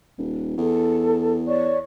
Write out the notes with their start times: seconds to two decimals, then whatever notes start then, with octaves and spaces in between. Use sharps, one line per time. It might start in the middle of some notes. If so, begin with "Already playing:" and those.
0.18 D#1
0.57 E2 A4
1.47 C#5 D5 C#6